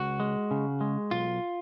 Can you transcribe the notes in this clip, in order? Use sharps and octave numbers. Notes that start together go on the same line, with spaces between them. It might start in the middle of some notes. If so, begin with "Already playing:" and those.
Already playing: C#2 F#4
G#3
C#3
G#3
B1 F4